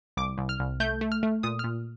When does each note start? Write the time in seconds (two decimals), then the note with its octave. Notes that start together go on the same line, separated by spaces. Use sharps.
0.17 C2 D6
0.38 C2
0.49 F6
0.59 C2
0.80 A3 G6
1.01 A3
1.12 F6
1.23 A3
1.43 A#2 D#6
1.59 F6
1.64 A#2